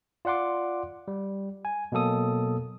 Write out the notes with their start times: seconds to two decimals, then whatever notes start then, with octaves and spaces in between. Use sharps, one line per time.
0.25 F4 D5 F#5 C6 D6
1.08 G3
1.65 G#5
1.92 B2 F#3 A#3 A4 D#6